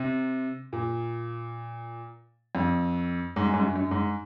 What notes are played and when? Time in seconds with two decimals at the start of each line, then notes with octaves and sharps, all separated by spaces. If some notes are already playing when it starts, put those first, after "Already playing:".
Already playing: C3
0.73 A#2
2.55 F2
3.36 G#2
3.45 F#2
3.54 G#2
3.60 F#2
3.76 F#2
3.91 G#2